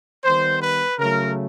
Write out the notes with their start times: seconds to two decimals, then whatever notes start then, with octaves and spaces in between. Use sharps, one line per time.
0.24 D#3 G3 B3 C5
0.61 B4
0.98 C#3 F#3 A3 A#4